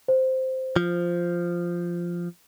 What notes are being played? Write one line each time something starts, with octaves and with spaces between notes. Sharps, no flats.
C5
F3